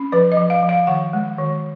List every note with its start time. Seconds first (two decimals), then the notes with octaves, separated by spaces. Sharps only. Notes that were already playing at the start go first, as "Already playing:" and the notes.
Already playing: C#4
0.12 F3 B4
0.32 D#5
0.37 F3
0.50 F5
0.63 F3
0.69 F5
0.87 D#3 F#5
1.13 G#3
1.38 D#3